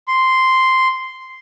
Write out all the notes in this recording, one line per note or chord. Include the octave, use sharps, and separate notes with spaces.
C6